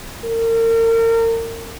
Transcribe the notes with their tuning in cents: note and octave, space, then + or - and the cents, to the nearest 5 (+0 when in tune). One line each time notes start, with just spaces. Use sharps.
A#4 -35